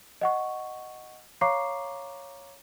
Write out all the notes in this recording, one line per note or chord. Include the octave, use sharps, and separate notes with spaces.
D#5 F#5 C#6
C#5 F5 A#5 C#6 D6 C7